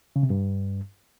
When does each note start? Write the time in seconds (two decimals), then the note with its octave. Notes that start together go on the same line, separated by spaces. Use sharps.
0.16 C#3
0.23 C3
0.30 G2